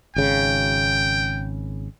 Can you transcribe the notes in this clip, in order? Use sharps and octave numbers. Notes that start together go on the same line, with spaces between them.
G#1 C#3 G5